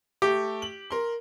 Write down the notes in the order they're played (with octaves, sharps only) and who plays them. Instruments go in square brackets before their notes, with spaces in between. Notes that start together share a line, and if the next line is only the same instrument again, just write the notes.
[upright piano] A3 [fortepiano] G4
[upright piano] F#7
A#4 C6